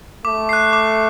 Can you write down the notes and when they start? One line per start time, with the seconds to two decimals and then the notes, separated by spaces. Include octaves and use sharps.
0.25 A3 D6
0.49 F#6 C7
0.73 D6